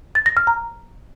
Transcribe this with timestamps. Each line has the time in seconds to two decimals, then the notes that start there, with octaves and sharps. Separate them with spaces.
0.15 A6
0.26 A#6
0.37 F6
0.47 A#5